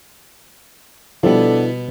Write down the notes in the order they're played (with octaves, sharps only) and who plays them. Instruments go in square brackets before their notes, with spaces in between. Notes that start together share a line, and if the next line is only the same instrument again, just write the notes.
[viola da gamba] B2 B3 [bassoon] D3 [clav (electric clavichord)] F3 G3 [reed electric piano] E4